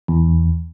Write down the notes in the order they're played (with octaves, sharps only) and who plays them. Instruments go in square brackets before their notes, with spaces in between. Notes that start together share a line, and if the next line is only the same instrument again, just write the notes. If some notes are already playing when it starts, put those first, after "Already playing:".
[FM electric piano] E2